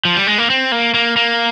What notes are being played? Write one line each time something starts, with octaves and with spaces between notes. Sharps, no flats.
F3
G3
G#3
A#3
C4
A#3
A#3
A#3